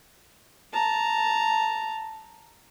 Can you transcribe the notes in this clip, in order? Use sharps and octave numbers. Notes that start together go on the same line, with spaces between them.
A5 A#5